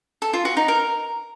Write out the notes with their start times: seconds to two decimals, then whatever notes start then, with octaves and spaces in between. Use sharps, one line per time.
0.22 A4
0.33 F4
0.45 F#4
0.57 D#4
0.68 A#4